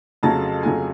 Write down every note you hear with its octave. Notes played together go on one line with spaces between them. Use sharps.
F2 C#3 F#3 A3 A5
F2 C#3 F#3 A3 G#5